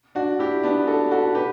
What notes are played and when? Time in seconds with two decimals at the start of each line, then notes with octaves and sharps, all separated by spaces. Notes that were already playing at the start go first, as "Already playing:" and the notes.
0.15 D4 F#4
0.39 E4 G4
0.63 B3 D4
0.87 F#4 A4
1.11 F#4 A4
1.35 G4 B4